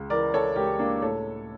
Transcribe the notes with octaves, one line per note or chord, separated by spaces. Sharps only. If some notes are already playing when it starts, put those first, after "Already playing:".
Already playing: C#2
E3 A#4 D5
A4 C#5
C#2 G4 A#4
A#3 D4
A2 A4 C#5